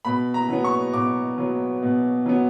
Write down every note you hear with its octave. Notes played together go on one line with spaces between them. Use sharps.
B2 B5
A#5
F#3 B3
C#6
B2 D6
F#3 B3
B2
F#3 B3